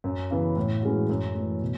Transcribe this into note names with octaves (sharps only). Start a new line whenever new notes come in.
F#2
C#3 E3 B3
A2
E3 G#3 C#4 F#4
F#2
E3 A3
B2